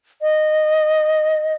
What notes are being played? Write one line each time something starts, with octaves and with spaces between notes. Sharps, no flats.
D#5